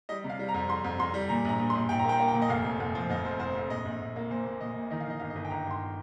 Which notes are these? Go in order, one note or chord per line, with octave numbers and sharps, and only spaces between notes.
G3 D#5
C3
F5
G3
A#5
F2
F2 C6
F2
F2 C6
G3
A#2 A#5
A#1 A#5
A#1
C6
A#1
A#1 G5
A#5
A#3 G5
A#3 A#5
G5
A#2
D#5
F1 F5
F2
F1
F3
F1 D#5
F2 C5
F1 C5
F2
A#1 D#5
A#1
A#1
A#3
A#2 C5
A#2
A#2 D#5
A#2
D#3 D#5
F5
D#3 D#5
G1 F5
D#5
G1
G5
G1 A#5
G1 C6